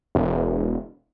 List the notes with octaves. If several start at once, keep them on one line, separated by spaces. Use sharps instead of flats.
E1